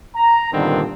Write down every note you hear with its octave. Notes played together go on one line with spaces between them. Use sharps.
A#5
G2 A#2 D3 D#3 B3 C4